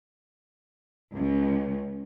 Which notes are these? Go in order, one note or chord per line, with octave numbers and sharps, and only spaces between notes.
C#2